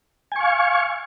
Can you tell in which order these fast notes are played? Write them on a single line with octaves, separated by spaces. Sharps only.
G#5 C#6 F5